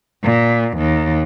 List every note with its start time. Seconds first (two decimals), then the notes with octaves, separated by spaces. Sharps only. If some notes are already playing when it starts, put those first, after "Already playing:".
0.24 A#2
0.77 D#2